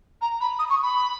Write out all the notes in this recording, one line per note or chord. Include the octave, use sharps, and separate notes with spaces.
A#5
B5
D#6
C#6
B5